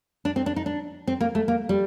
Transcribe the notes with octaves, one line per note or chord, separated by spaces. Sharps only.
D4
C4
D4
D#4
D4
C4
A#3
A3
A#3
G3